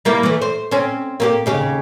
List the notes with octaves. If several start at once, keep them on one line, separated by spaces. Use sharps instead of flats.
G3 A#3 E4
E3 A3
C5
C4 C#4
A#3 C4 G4
D#2 C#3 G4